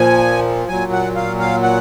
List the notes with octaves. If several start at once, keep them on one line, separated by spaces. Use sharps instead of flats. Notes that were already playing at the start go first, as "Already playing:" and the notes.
Already playing: A#2 F3 G#5
A#2 F#3 G#5
F#5
F5
F5
F#5